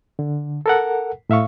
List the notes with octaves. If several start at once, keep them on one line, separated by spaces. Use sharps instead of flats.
D3
A4 A#4 F#5
A2 E5 F5 C#6